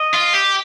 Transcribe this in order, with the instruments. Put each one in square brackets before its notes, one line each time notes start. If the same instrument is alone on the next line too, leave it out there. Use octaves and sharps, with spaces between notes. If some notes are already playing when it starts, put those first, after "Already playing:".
Already playing: [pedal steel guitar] D#5
[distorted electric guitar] F4
G4